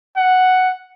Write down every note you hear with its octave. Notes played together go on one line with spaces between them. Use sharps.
F#5